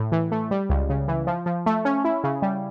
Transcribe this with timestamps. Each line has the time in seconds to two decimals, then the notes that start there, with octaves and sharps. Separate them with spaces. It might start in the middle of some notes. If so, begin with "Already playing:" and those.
Already playing: A2
0.12 E3
0.32 A3
0.51 G3
0.70 C#2
0.89 C#3
1.08 E3
1.27 F3
1.46 F3
1.66 A3
1.85 C#4
2.05 E4
2.24 C#3
2.42 G3